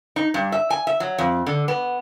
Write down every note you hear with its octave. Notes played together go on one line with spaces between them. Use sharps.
D#4
G2
E5
G#5
E5
F#3
F2
D3
B3